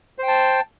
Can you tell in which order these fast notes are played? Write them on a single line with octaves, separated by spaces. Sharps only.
C5 G5 A5